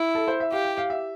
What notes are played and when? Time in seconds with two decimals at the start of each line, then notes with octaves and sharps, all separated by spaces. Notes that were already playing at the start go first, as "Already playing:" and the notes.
Already playing: E4
0.15 A4
0.28 C5
0.40 E5
0.52 G4 F5
0.65 G5
0.78 F5
0.90 E5